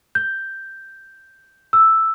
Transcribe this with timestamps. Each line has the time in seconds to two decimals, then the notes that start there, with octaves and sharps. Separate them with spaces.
0.15 G6
1.73 E6